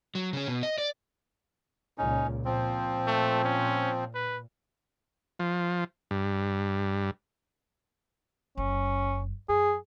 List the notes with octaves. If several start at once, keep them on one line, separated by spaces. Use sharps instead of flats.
F#3
C#3 C#4
B2
D#5
D5
C#2 A#2 C#4 D#4
A#2 F3 C4
A3
C#4
B4
F3
G2
F#1 F#2 C#4
F#2 G#4